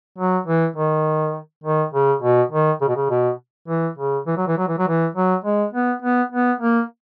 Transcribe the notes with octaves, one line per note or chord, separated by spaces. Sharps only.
F#3
E3
D#3
D#3
C#3
B2
D#3
C#3
B2
C#3
B2
E3
C#3
E3
F#3
E3
F#3
E3
F#3
E3
F#3
G#3
B3
B3
B3
A#3